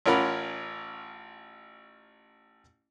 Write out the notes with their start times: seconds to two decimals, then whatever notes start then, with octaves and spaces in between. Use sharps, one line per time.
0.06 A1 C#4 F4 A#4 F#5 B5